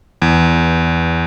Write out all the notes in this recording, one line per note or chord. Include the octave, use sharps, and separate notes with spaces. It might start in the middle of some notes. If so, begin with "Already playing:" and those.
E2